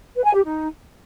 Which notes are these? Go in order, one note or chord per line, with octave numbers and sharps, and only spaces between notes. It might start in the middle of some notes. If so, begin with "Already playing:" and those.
B4
G#5
G4
D#4